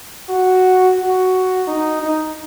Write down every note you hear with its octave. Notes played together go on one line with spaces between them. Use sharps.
F#4
F#4
D#4
D#4